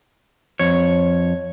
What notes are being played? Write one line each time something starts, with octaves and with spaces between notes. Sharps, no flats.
F2 C#5